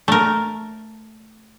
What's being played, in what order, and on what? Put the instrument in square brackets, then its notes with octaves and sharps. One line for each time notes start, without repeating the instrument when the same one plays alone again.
[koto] A3 A#4